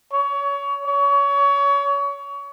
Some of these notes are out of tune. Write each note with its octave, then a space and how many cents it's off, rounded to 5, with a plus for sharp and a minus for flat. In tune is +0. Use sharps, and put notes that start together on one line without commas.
C#5 +25
C#5 +30